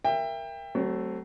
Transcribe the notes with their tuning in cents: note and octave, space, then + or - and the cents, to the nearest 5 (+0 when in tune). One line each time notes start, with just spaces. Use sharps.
A#4 +0 E5 +20 G5 +25
F#3 +35 A3 +0 C4 +0